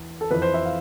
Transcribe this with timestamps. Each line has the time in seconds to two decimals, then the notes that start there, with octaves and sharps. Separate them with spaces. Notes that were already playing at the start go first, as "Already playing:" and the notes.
Already playing: E2
0.21 A4
0.31 F2 E3 B4
0.42 C5
0.54 E5
0.65 F5